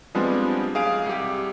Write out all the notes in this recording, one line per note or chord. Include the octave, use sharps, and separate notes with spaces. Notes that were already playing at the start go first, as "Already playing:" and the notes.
F3 G3 G#3 B3 C4 D4
B1 G#4 F5 D7
C2 G4